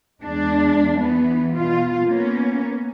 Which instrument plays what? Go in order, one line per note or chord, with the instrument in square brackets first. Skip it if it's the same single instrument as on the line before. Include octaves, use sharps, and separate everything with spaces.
[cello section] E2 G#3 D4
E3 B3
B2 F4
A#3 B3 C#4